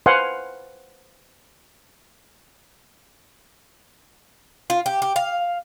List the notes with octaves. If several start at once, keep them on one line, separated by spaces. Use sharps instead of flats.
B4 C5 F5 F#5 G#5 C6
F4
G4
G4
F5